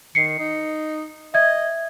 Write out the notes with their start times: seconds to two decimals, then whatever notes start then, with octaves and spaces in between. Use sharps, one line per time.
0.15 D#3 C7 C#7
0.39 D#4
1.34 D#5 E5 G#6